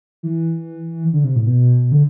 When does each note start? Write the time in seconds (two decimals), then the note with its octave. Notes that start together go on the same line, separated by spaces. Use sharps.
0.23 E3
1.13 D3
1.24 C3
1.36 A2
1.47 B2
1.92 D3